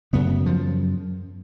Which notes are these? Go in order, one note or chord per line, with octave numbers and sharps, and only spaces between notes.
F#2 C#3 B3
F3